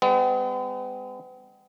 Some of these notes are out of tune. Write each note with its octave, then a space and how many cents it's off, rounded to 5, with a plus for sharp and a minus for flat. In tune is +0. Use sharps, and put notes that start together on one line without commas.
G#3 -40 B3 +45